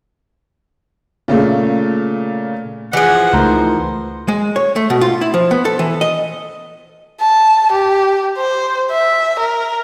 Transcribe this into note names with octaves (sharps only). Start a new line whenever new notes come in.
A#2 C#3 A3
E3 F3 G#4 F#5
C#2 A3 D#4 A#4 C5 A#5
G#3
C#5
A3
B2
F4
E4
F3
B3
A4
E3
D#5
A5
G4
C5
E5
A#4